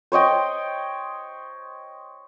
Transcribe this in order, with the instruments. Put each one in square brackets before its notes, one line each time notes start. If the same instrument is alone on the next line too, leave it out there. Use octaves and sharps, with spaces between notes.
[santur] C5 C#5 D#5 G5